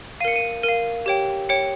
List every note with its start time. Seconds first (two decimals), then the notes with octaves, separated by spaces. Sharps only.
0.20 F5 D#7
0.25 A#4 C#7
0.36 D#7
0.63 A#4 D#7
0.68 F5
1.06 G4 C#5 G5
1.49 G4 C#5 G5 C#7